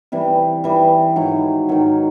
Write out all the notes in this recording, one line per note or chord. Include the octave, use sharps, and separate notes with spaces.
C3 E3 G3
C3 E3 G3
G#2 D#3 F#3
G#2 D#3 F#3